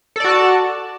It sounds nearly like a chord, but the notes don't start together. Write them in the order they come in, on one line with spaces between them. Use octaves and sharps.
A4 D5 F#4 A5